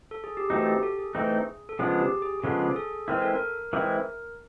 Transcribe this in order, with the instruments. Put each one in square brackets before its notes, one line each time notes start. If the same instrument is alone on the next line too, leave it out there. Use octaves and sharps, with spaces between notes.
[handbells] A4
G#4
G4
[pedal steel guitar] E3 A3 C4 D#4 [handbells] F#4
[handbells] G4
A4
G#4
[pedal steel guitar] E3 A3 C4 D#4
[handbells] A4
[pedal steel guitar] C#3 F3 G#3 B3 D4 [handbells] G#4
[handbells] G4
G#4
G#4
[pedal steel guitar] C#3 F3 G#3 B3 D4 [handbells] A4
[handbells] G#4
A4
[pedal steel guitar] E3 G#3 C4 E4 [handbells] A#4
[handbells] A4
A#4
[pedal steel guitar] E3 G#3 C4 E4 [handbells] A#4